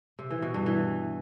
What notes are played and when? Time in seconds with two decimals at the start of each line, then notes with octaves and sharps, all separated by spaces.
0.19 C3
0.31 E3
0.42 B2
0.54 G2
0.66 E3